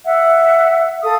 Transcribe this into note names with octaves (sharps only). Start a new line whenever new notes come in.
E5 F#5
A4 F5 D#6